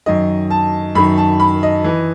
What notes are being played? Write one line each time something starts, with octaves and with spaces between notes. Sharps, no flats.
F#2 D#3 D#5
A5
F#2 D#3 B5
A5
B5
D#5
E3